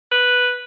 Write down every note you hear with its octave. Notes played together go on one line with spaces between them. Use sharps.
B4